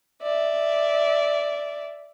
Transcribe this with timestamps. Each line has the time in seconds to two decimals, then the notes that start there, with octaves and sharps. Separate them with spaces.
0.22 D5 E5